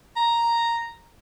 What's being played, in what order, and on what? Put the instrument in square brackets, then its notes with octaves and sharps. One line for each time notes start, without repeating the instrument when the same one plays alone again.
[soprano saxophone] A#5